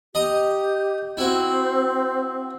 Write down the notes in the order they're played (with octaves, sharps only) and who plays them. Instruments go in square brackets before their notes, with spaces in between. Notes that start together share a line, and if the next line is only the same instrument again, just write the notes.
[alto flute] G4 [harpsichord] D#5 A#5 D#6
[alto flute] C4 [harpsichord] E4 F#4